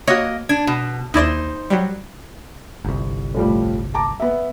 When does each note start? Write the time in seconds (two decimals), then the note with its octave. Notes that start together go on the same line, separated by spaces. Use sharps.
0.07 A#3 F#4 C#5 D#5
0.49 D4 G#6
0.67 B2
1.14 D#2 D#4 E4 C5 D5
1.70 F#3 G3
2.85 G1 C2
3.34 A2 F3 G3
3.94 A5 A#5 D6
4.20 B3 E5